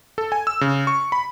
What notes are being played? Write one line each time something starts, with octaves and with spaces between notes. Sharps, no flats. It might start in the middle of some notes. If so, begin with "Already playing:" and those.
A4
G#5
E6
C#3
C#6
B5